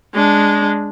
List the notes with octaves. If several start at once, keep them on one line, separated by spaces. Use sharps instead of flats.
G#3 D4